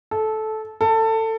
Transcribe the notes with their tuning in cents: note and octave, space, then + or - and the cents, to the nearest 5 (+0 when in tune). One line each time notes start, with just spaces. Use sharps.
A4 -15
A4 +20